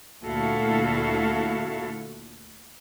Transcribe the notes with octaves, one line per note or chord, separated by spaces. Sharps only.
D2 A#2 E4 F#4 A4 F5